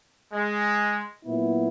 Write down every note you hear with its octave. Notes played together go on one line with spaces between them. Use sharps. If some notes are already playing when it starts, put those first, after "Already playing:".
G#3
A#2 F#3 B3 E4